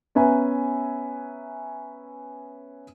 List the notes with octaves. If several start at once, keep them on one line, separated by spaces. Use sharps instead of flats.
B3 C#4 B4 E5 G#5 A#5